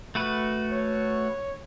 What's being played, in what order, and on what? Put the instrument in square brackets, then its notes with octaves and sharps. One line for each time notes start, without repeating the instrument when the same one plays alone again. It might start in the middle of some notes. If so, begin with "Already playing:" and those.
[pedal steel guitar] A3 F#4 B4
[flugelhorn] C#5